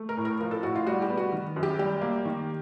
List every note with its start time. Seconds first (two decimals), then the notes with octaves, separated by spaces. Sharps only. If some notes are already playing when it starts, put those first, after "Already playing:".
Already playing: A3
0.09 A#4
0.17 A2
0.25 A#4
0.41 F3 A#4
0.51 A4
0.63 A2 F#4
0.75 F4
0.87 G3 F#4
1.02 G4
1.10 B3
1.17 F#4
1.32 D#3
1.56 F#2
1.63 G4
1.79 G3 G4
2.01 A#3
2.25 D#3